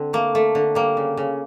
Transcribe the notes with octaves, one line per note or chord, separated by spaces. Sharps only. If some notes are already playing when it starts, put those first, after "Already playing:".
Already playing: D3 C4
A3 A#3
A3
D3
G3 A#3
C#3
C#3